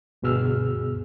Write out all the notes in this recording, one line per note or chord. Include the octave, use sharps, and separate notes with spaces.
D2 G2 B2 G#4 E6 F6